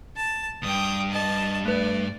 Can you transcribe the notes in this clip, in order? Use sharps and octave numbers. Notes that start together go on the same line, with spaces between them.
A5
E2 G2 G5 D#6
D#5 A5
A3 B4 D5